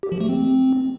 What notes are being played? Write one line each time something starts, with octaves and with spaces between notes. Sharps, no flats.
G4
F3
A3
C4